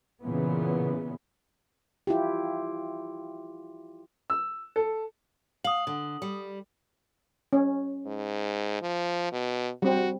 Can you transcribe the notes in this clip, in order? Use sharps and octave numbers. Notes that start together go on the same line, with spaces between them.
A#2 C#3 E3 B3
E4 F4 G4
E6
A4
F5 D#6 F#7
D3
G3
C#4
G#2
F3
B2
G3 C4 F#4